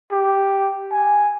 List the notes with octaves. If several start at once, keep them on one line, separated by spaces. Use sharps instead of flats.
G4
G#5